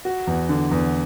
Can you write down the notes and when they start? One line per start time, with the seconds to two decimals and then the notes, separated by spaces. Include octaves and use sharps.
0.05 F#4
0.27 E2
0.49 D3
0.71 E2